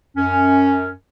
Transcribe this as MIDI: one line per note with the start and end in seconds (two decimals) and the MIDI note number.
0.17 0.88 42
0.17 0.88 61